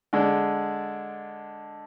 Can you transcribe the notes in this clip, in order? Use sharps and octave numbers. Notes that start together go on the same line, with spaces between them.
D3 G#3 D4